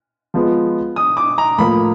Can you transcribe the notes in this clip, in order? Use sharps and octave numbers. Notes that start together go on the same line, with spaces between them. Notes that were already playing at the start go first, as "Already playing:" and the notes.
F3 G#3 B3
D#6
D6
A#5
A2 F3 A#3 B5